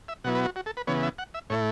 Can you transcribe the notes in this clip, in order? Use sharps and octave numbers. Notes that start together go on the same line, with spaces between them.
E5
B2 F#3 B3 E4 F#5
B4
F#4
F#4
A4
B4
C#3 E3 B3 C#5
E5
F#5
E5
A2 A3 E4 C#5